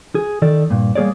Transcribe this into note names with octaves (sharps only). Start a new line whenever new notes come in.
G#4
D#3 A4 D5
G2 A#2
G3 A#3 G#4 C#5 D5